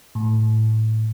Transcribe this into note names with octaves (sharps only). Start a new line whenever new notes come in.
A2